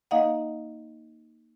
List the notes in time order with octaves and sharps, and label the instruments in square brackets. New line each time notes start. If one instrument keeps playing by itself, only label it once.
[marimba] A#3 D#4 D#5 F5 F#5